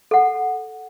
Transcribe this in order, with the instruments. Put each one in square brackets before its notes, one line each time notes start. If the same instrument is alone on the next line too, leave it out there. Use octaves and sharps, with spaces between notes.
[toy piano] A4 F#5